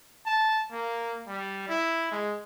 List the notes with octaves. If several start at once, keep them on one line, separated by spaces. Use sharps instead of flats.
A5
A#3
G3
E4
G#3